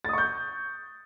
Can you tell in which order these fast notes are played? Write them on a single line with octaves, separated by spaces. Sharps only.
A6 D#6 C#6 G6